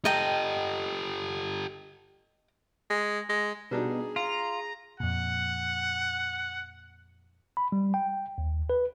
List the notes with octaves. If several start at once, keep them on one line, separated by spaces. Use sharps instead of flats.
G4 A4 D#5 G5 A#5
G#3
G#3
B2 G3 D4 D#4 G#4
F4 F5 A#5
F2 A#2 F#5
B5
G3
G5
D#2
B4